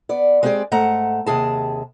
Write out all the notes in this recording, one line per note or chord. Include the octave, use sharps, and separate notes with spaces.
B3 D5
G#3 B3 C4 G4 G#4 D5
G#2 A3 F#5 A#5
D#2 C3 G#4 A5